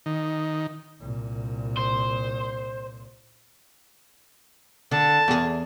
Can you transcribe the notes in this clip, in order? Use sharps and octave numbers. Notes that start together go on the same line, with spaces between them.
D#3
C2 A#2
C5
D3 A5
E2 G#4